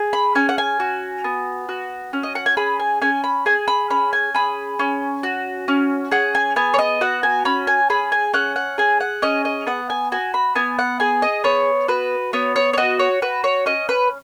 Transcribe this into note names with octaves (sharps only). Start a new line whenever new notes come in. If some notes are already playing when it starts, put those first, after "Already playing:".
Already playing: G#4
B5
C#4 G#5
F#5
G#5
F#4
B3
F#4
C#4
D#5
F#5
G#5
G#4 B5
G#5
C#4 G#5
B5
G#4 G#5
B5
C#4 B5
G#5
G#4 B5
C#4
F#4
C#4
G#4 F#5
G#5
B3 G#5
C#5
D#5
F#4 F#5
G#5
C#4 B5
G#5
G#4 B5
G#5
C#4 F#5
F#5
G#4 G#5
F#5
C#4 D#5
D#5
B3 F#5
G#5
F#4 G#5
B5
B3 G#5
F#5
G#4 G#5
D#5
B3 C#5
F#4 B4
B3 C#5
C#5
C#5
F#4 D#5
C#5
F#4 B4
C#5
C#4 D#5
B4